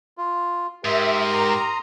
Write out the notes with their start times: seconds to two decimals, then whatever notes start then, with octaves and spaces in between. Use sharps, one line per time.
0.18 F4
0.85 G#2 G4 A#4 E5 C6 D#6
1.33 A#5